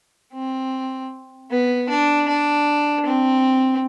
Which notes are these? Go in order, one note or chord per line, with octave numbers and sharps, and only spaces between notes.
C4
B3
D4
D4
C4